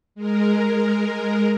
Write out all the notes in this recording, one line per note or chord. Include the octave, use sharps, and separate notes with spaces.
G#3 A#4